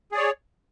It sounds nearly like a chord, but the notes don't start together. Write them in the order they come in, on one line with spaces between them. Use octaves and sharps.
G#4 D5 C#5